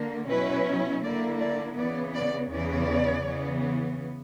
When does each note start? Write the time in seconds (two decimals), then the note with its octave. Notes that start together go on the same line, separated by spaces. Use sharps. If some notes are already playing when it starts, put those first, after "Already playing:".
Already playing: D3 A#3
0.28 B2 F#3 C#4 E4 B4
1.03 D3 A#3 E4 D5
1.40 D5
1.77 C#3 E3 B3 D5
2.15 D5
2.52 E2 C#3 E3 B3 D5
3.26 C#3 E3 B3